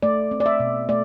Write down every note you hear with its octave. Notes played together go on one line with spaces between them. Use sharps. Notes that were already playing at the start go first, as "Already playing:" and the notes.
A3 D5
C4
D5
E5
B2
A3 D5